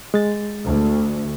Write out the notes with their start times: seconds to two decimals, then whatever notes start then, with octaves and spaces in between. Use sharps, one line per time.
0.14 G#3 A6
0.66 D2